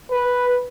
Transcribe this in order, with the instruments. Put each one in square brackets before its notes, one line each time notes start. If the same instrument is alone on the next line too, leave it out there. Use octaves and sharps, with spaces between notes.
[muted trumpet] B4